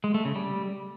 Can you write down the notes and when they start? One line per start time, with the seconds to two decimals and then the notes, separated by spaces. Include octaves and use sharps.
0.04 G#3
0.14 A3
0.25 C#3
0.36 G3